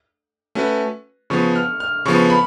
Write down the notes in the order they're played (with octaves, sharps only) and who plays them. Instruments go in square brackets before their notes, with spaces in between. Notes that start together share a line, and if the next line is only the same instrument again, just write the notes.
[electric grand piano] A3 C#4 F#4 B4
[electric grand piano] C#3 F3 B3 [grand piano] C#6
[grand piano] F6
F6
[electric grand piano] C#3 F3 B3 [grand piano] C#6
[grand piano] B5